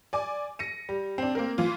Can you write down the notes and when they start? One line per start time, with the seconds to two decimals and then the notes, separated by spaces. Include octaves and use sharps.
0.13 D5 G#5 D6
0.59 A#6 C#7 D#7
0.89 G3
1.18 C4 D4
1.35 A#3 C4 A#4
1.58 E3 F4